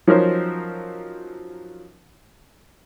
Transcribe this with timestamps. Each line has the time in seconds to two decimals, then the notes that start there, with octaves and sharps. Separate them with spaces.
0.07 F3 F#3 C#4 D#4 A#4 C5